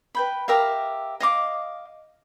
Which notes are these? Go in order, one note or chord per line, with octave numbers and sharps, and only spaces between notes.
B4 G5 B5
G4 A#4 E5 F5
D#5 F5 D6